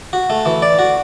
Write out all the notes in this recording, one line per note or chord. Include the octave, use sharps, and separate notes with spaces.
F#4
A3
E3
D5
F#4